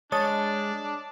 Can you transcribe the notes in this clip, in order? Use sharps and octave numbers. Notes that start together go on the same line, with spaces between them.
G#3 D4 C#5 A5 D#6 A6